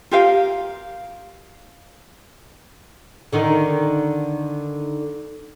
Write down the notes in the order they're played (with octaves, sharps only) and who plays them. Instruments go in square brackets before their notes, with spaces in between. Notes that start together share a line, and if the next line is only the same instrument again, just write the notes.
[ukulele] F4 G4 A#4 F5
[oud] D3 D#3 D#4